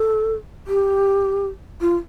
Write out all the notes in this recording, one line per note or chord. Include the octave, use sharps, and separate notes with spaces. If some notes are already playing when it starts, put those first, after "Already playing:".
Already playing: A4
G4
F4